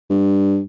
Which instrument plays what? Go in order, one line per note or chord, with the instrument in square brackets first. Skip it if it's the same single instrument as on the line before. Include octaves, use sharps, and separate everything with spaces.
[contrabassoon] G2